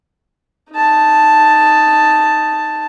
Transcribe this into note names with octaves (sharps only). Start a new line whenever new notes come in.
D#4 A5